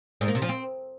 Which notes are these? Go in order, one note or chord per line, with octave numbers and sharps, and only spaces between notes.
G#2
A#3
C3
F3
C4